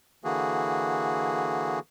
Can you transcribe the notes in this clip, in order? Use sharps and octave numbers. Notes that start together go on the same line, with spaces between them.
D3 E3 A#3 F#4 G#4